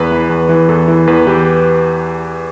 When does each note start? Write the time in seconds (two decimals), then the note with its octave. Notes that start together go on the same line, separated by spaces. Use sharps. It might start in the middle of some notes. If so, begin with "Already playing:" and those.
Already playing: E2 B4
0.12 E3
0.30 E2
0.49 E3
0.69 E2 A4
0.88 E3
1.07 E2 B4
1.27 E3 G4